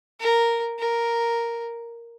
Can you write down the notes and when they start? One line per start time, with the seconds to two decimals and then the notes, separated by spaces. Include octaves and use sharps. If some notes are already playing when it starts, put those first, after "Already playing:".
0.20 A#4
0.79 A#4